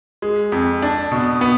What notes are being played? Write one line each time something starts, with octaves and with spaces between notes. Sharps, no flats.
G#3
F2
D4
B2
B3